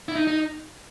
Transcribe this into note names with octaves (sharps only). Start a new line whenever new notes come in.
E4
D#4
D#4